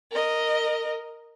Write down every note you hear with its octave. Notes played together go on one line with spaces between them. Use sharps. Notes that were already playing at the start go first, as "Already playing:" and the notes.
A#4 D#5